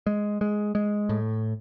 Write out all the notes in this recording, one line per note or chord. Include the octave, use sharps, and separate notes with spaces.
G#3
G#3
G#3
A2